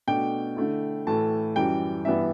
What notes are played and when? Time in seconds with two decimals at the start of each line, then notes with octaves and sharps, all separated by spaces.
0.07 B2 A3 D4 G5
0.57 D3 A3 E4
1.07 A2 E3 A3 A5
1.56 F#2 E3 G3 G5
2.05 G2 E3 G3 B3 E5